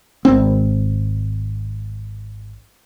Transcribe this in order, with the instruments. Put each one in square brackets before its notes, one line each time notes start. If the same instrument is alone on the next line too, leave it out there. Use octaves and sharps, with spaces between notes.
[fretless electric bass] G#1 C4